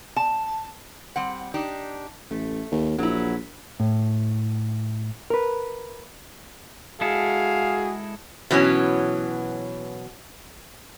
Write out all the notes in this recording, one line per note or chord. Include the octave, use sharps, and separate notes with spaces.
A5
G3 C4 F#5
D4 D#4 G4
A1 A3
D#2
A#1 F#3 E4
A2
A#4 B4
G#3 E4 F#4 G#4 A4 F5
B2 E3 F#3 C4 C#4